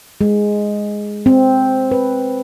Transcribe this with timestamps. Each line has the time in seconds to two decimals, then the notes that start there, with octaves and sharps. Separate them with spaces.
0.21 G#3
1.26 C4
1.91 B4